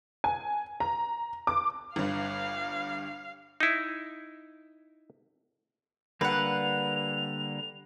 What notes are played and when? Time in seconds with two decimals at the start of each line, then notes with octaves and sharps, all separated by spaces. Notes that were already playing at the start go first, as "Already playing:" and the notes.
0.24 G#5
0.80 A#5
1.47 D6
1.96 G1 G2 F5
3.60 D#4 E4
6.21 D3 G3 A#3 B4 F#5 F7